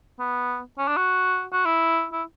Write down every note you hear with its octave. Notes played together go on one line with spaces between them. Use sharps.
B3
C#4
D4
F#4
F#4
E4
E4